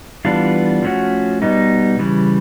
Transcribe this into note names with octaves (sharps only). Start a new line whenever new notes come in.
E3 G3 B3 D4 F4
F3 A3 C#4 F#4
B2 G3 B3 D#4
C#3 E3 G3